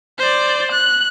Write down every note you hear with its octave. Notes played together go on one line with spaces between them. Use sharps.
C5 D5
F#6